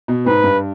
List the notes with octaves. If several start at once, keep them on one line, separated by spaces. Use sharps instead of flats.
B2
G#2 B4
G2